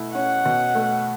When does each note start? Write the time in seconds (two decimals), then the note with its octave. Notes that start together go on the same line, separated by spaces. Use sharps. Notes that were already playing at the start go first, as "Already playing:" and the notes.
Already playing: B2 A3 E4
0.14 C#4 F#5
0.45 B2
0.75 A3